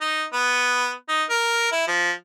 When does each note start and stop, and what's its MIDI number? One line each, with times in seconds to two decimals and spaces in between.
0.01 0.24 63
0.33 0.91 59
1.09 1.24 63
1.30 1.72 70
1.72 1.85 64
1.88 2.11 53